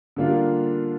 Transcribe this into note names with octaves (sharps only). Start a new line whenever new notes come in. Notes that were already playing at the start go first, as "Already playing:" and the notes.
D3 G3 A#3 D4 F4